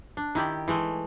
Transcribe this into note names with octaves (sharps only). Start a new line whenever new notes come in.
D4
D#3 E4 G4 D5
E3 G#3 A3